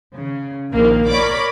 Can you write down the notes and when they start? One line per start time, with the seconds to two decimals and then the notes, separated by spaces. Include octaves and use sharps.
0.16 C#3
0.72 A#1 D#3 A#3
1.07 A#4 C#5 D5 B5 D6